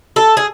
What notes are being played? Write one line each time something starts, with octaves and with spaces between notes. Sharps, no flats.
A4
G#4